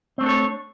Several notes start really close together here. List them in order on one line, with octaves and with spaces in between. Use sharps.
C4 A3 D4 A4 C#5